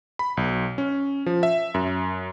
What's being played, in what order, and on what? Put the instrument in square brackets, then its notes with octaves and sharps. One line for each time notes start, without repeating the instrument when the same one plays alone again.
[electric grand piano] B5
B1
C#4
F3
E5
F#2